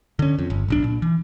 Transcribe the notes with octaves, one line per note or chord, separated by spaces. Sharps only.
D3 C#4
F2
G1
D1 B1 D4
A#2
E3